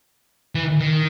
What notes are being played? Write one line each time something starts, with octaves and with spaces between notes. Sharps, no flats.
E3
D#3